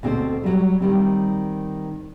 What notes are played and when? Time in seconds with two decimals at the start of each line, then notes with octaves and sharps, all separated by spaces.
0.03 D2 B2 C4 F#4 A4 C5
0.44 F#3 G3
0.80 D#3 G3 C4